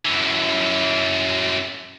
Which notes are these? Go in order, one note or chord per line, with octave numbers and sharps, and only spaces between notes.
F#2 E3